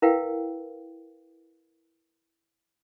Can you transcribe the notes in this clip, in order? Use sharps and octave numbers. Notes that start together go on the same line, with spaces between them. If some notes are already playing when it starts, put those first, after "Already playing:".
E4 A#4 B4 F5 G5